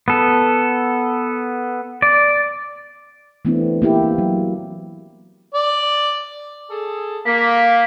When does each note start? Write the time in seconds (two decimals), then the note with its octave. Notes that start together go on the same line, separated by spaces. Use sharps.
0.08 B3 A4
2.02 D5
3.45 E3 A3 B3 C4 D4 E4
3.82 A#3 E4 G4
4.18 F#3
5.54 D5
6.71 G#4 A4
7.25 A#3 B6